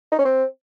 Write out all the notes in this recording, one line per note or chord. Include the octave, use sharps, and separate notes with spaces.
D#4
C#4
C4